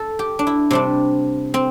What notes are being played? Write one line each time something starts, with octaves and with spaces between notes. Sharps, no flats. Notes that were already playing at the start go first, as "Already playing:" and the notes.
Already playing: A4
G4
D4
E4
C3 G3 C4 D4
C4